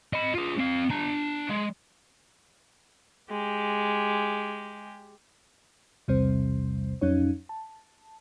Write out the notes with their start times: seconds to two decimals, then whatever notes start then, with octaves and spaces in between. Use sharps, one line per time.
0.13 D#5 B5
0.34 F4 G#4
0.59 C4 F5
0.90 D4 A#5
1.49 G#3
3.30 G#3 G4
6.08 B1 E2 C3 G3 C4 C5
7.01 F2 F#3 C#4 D#4 C#5
7.49 A5